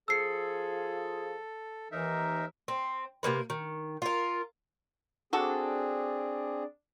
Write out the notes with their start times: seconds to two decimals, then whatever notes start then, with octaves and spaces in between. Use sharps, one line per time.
0.08 F3 F4 G#4 A4 E6 C7 C#7
1.92 D#2 E3 D#4 A#4 E5
2.68 C4
3.23 C3 G3 A#3 B4
3.50 D#3
4.02 F4 A#4
5.33 C4 D4 F#4 G#4 A4